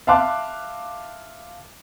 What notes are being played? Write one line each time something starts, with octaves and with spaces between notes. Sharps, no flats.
E5 F5 A5 C6 D6 F#6